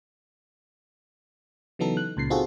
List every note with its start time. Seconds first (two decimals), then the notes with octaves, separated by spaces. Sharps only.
1.79 C#3 E3 F#3 B3 D#4 A4
1.97 F#6
2.17 C#2 A#2 C#3 C7
2.30 C4 D#4 F4 F#4 G#4 A4